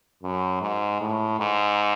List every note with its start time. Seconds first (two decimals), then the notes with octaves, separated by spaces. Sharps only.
0.23 F#2
0.62 G#2
1.01 A2
1.40 G#2